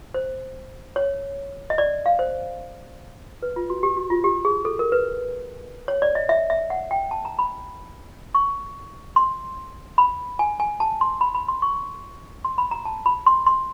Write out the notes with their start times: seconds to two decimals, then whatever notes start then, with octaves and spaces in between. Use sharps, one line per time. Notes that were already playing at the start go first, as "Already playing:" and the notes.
0.14 C5
0.96 C#5
1.70 D#5
1.78 D5
2.06 F5
2.19 C5
3.42 B4
3.56 F4
3.70 F#4
3.83 G4
3.97 F#4
4.10 F4
4.24 G4
4.45 G#4
4.65 A4
4.79 A#4
4.92 B4
5.88 C#5
6.02 D5
6.15 D#5
6.29 E5
6.50 E5
6.70 F#5
6.91 G5
7.11 A5
7.25 A#5
7.39 B5
8.35 C#6
9.16 C6
9.98 B5
10.39 G#5
10.60 G#5
10.80 A5
11.01 C6
11.21 B5
11.35 B5
11.48 C6
11.62 C#6
12.44 C6
12.58 B5
12.71 A#5
12.85 A5
13.06 B5
13.26 C6
13.46 C6